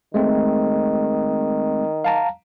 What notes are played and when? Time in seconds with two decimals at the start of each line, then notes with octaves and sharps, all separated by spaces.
0.14 D#3 G#3 A3 C4
2.04 F5 A5 A#5